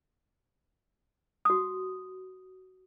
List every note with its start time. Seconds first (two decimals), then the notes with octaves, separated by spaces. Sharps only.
1.45 F#4 D#6